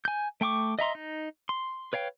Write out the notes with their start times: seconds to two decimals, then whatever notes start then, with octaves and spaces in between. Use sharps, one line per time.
0.05 G#5 G6
0.41 A3 G5 C#6 D6
0.79 D#5 E5 A#5 C6
0.95 D#4
1.49 C6
1.93 B4 C#5 F5 G5